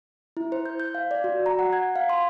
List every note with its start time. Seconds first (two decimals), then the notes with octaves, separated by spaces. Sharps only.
0.37 E4
0.52 C5
0.66 G6
0.80 G6
0.95 F5
1.11 D5
1.24 F#4
1.46 A#5
1.59 F#5
1.73 G#6
1.96 F5
2.10 C6